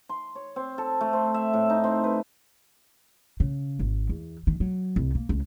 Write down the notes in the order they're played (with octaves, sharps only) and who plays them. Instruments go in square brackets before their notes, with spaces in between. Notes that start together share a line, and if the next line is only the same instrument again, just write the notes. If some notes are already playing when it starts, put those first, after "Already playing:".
[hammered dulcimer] C6
C#5
C4
A4
A3
C4
E5
A2
D#4
C4
B4
[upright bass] C#3
G#1
E2
D#3
F#3
C2
A#3
C#2